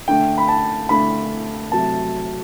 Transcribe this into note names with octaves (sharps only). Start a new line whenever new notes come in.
D3 A3 G5
B5
A5
D3 A3 B5
C3 F#3 A3 A5